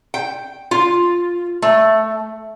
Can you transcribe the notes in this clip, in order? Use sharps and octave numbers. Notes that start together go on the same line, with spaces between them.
G5
F4
A3